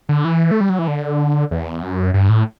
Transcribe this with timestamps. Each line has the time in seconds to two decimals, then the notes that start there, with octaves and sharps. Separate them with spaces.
0.09 D3
0.25 E3
0.51 A3
0.61 G3
0.70 F#3
0.79 E3
0.88 D3
1.51 E2
1.82 F#2
2.14 G2
2.29 A2